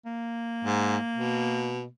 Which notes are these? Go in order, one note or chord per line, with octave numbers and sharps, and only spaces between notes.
A#3
G#2
B2